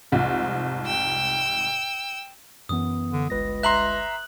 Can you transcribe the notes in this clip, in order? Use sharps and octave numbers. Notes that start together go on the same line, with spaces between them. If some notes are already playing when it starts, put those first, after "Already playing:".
C2 F2 G#2
G5 E6
F#2 E3 B3 D#6
D3
G1 C#2 B4 A#6
E5 A#5 C6 F#6 F#7